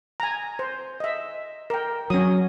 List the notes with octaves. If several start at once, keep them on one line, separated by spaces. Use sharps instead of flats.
G#5 A#5
C5
D#5 E5
A#4 G5
F#3 C#4 D#6